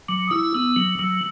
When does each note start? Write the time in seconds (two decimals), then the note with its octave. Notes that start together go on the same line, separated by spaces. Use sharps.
0.08 F#3 D6
0.28 D#6
0.31 E4 E6
0.54 B3 E6
0.76 F#3
0.99 F#3 E6